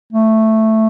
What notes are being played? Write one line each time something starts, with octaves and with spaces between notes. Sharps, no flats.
A3